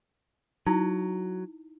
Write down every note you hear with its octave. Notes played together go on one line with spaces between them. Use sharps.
F#3 D#4 E4